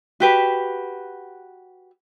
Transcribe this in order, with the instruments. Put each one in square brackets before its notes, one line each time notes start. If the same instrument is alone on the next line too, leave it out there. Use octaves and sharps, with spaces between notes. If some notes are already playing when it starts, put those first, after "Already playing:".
[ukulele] F#4 G4 B4